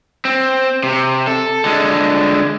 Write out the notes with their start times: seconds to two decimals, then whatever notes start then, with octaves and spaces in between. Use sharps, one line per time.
0.25 C4
0.83 C3
1.27 A4
1.65 D3 G#3